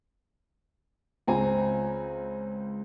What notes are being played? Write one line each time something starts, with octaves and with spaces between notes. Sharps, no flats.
C#2 C4 G#5 A#5